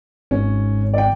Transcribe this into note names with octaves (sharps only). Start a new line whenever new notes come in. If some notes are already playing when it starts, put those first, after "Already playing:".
G#1 C#4
D5 G5